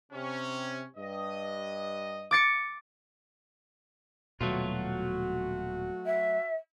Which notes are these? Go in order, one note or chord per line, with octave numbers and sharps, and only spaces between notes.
C3 C#4
G2 D#5
D6 A6 C#7
D#1 B2 F#3 A3 B3 F4 F#4
E5